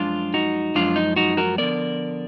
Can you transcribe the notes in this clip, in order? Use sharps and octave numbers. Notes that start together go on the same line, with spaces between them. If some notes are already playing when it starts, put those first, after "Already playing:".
Already playing: F#2 F3 G#3 D4 F4
D#4 F#4
F#2 F3 G#3 D4 F4
D#4
D#4 F#4
F#4 A#4
D3 F3 B3 A#4 D5